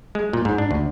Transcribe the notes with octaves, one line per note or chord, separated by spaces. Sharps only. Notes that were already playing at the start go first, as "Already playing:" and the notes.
G#3
A#2
G#2
D4
D2